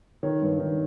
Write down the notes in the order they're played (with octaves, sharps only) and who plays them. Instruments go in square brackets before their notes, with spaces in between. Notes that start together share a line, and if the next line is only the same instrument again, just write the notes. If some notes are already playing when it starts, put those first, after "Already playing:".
[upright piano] D#3 C#5
G2
D#3